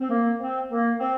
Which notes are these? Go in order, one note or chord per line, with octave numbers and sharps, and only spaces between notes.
C4
A#3
C4
A#3
C4